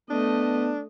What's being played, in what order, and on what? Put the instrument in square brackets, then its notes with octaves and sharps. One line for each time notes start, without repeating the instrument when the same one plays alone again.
[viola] A3 D#5 [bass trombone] B3 [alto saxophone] D4